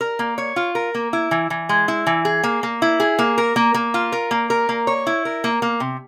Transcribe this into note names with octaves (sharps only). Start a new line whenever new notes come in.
A#4
A#3
C#5
F4
A#4
A#3
E4
E3
E3
G#3
E4
E3
G#4
A#3
A#3
E4
G#4
A#3
A#4
A#3
A#3
F4
A#4
A#3
A#4
A#3
C#5
E4
A#4
A#3
A#3
C3